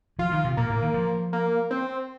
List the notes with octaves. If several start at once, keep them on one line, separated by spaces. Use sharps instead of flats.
F3 F4
D#3
C3
A#2 A#3
A2
D#3
F3
A#3
C4